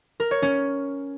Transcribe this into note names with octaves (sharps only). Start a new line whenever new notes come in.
A#4
C#5
C#4